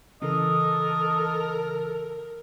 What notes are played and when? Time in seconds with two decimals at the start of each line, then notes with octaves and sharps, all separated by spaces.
0.22 C#3 E3 A4 A#4 D#5